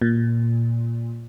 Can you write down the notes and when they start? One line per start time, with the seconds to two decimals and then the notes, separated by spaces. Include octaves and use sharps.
0.02 A#2